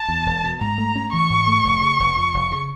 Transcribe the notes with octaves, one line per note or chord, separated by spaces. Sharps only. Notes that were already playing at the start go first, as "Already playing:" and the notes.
Already playing: A5
E2
E1
B2
G#2 A#5
A3
C#4
E3 C#6
G#2
A3
F1
C#3
F1
F2
F1
C#3